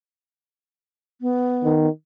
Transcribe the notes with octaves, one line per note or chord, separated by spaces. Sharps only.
B3
D#3